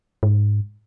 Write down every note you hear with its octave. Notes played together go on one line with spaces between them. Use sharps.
G#2